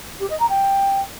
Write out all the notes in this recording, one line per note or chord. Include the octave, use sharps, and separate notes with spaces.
G4
D#5
A#5
G5